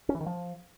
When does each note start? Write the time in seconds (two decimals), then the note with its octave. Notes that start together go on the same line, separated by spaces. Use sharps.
0.09 C#4
0.15 E3
0.21 D#3
0.26 F3